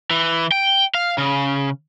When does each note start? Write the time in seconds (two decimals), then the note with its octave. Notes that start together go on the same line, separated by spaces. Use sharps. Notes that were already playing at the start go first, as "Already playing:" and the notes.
0.11 E3
0.52 G5
0.95 F5
1.18 C#3